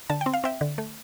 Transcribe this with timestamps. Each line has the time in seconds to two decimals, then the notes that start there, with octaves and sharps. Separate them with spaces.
0.10 D3 A5
0.21 G5
0.26 C4
0.33 F5
0.44 C4 E5 G5
0.61 D3
0.78 A3